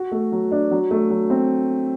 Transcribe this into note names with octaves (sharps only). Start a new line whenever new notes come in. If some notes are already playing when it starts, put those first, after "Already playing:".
Already playing: F#4
A3
F#3
D4
F#3
A3
F#3
C4